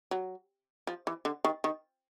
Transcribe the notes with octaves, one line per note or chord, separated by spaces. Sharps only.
F#3
F3
E3
D3
D#3
D#3